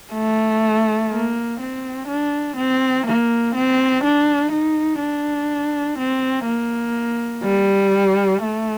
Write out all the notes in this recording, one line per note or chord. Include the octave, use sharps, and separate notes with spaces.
A3
A#3
C4
D4
C4
A#3
C4
D4
D#4
D4
C4
A#3
G3
A3